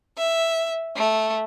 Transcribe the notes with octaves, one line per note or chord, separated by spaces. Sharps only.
E5
A3